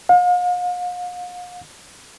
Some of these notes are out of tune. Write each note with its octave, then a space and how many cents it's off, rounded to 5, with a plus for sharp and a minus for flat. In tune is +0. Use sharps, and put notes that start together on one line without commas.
F5 +40